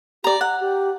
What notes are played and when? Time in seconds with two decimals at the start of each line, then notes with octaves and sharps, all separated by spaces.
0.24 G4 D5 A#5
0.41 F#5 A#5
0.60 G4